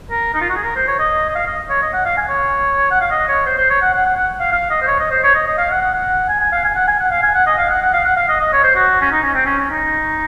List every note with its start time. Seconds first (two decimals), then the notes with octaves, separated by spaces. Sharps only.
0.11 A#4
0.34 D#4
0.41 F4
0.49 F#4
0.56 G#4
0.64 A#4
0.76 C5
0.88 C#5
0.99 D#5
1.30 D#5
1.35 F5
1.47 D#5
1.70 C#5
1.82 D#5
1.93 F#5
2.05 F5
2.17 G#5
2.28 C#5
2.91 F#5
3.01 F5
3.11 D#5
3.28 C#5
3.46 C5
3.58 C5
3.70 C#5
3.82 F#5
3.93 F#5
4.05 F#5
4.17 F#5
4.40 F5
4.52 F5
4.70 D#5
4.82 C5
4.87 C#5
4.99 D#5
5.11 C5
5.23 C#5
5.35 D#5
5.47 D#5
5.58 F5
5.70 F#5
5.81 F#5
5.93 F#5
6.29 G#5
6.40 G#5
6.52 F5
6.64 G#5
6.75 F#5
6.88 G#5
7.00 F#5
7.11 F5
7.23 G#5
7.34 F#5
7.47 D#5
7.58 F5
7.70 F#5
7.82 F#5
7.94 F5
8.05 F#5
8.17 F5
8.29 D#5
8.40 D#5
8.53 C#5
8.64 C5
8.76 F#4
9.02 C#4
9.11 D#4
9.23 C#4
9.34 C4
9.46 C#4
9.58 C#4
9.70 D#4